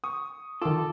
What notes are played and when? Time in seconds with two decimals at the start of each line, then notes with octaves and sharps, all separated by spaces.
0.04 C#6 D#6
0.62 D#3 F4 A4 A5 D6